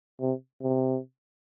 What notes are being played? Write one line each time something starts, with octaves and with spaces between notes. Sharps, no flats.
C3
C3